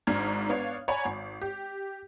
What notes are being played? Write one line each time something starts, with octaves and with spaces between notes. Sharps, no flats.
G#1 G#2 D4 A#5 F6 G#6
B3 D4 C#5 F5
C#5 D5 F#5 G#5 A#5 B5
G#1
G4